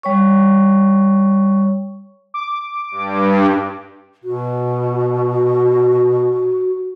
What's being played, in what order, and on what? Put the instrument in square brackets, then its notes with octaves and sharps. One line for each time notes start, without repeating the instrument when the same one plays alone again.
[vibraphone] G3 C#5 C#6
[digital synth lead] D6
[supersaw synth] G2
[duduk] B2 [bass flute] F#4